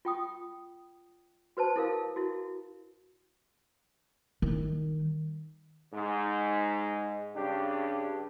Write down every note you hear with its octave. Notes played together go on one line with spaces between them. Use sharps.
F4 G5 D#6
F#4 B4 C5 A5
E4 A4 A#4 F5
E4 F#4
D#3 G3
G#2
G2 C#3 D4 G4